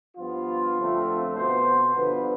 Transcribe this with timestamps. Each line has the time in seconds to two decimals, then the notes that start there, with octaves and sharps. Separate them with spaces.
0.17 G2 F3 B3 F4
0.76 F2 D3 A3 C4
1.35 B2 B3 C5
1.93 G2 D3 F3 B3 B4